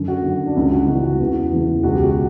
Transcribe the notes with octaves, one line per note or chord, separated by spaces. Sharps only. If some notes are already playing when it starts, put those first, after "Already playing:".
Already playing: F#2 D3
F#4
F#2 D3
D4
C#2 C#3 E3 E4
F#4
C#2 C#3 E3 F#4
F#4
E2 C#3 E3
E2 C#3 E3
C#2 B2 F#4
G4
F#4